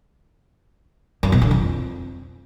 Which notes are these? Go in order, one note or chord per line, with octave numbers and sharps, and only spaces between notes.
F#2
B2
D3
F2